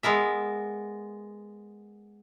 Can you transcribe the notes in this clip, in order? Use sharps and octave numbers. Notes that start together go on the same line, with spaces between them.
G#3 B3 A#4 E5